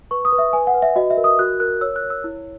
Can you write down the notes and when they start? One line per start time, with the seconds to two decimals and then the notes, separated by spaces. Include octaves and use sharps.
0.11 B4 C#6
0.25 D#6
0.32 B4
0.38 E5
0.53 B4 G#5
0.67 F#5
0.74 B4
0.82 E5
0.96 F#4 D#5
1.10 E5
1.17 A#4
1.24 D#6
1.39 F#4 F#6
1.60 A#4 F#6
1.81 C#5 E6
1.96 F#6
2.03 C#5
2.10 E6
2.24 E4